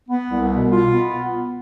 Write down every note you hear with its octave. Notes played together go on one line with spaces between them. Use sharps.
B3
C2
B2
F4
B3